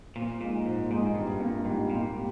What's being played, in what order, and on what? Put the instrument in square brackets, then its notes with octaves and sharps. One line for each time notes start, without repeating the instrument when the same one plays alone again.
[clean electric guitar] A#2 [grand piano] F3
[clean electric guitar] A#2 [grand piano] G#3 D#4
[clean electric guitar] G#2 [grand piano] F3
[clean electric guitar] A#2 [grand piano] G#3 D#4
[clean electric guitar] G#2
[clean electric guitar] G2 [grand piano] G3
[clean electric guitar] G2 [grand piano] A#3 F4
[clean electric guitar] G#2 [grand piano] G3
[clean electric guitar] A#2 [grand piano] A#3 F4
[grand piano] G3